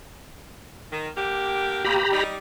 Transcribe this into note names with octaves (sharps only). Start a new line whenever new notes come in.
D#3
D3 A#3 G4
B2 A#3 G4 A#5 B5
G3 D#4